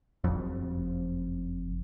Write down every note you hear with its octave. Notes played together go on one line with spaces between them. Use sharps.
F#1 F2